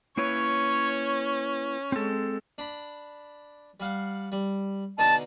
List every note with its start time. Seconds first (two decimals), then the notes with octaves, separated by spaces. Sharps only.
0.17 A#3 C#4 E4 B4 C#5
1.92 G#3 C4 A4
2.58 D4 B5
3.80 G3 F5 F#5
4.32 G3
4.98 B2 D3 D#4 A5